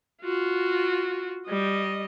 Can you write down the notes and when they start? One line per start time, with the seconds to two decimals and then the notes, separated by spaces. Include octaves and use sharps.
0.22 F4 F#4
1.47 G3 D#5